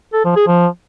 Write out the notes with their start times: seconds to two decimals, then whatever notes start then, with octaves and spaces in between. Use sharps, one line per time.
0.13 A4
0.25 F3
0.36 G#4
0.47 F3